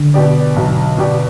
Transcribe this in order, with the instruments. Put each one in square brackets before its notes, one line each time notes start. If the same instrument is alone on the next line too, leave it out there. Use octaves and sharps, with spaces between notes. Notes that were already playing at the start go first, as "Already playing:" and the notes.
Already playing: [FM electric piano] D3
[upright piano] B2 B3 G4 D5
B1
B2 B3 G4 D5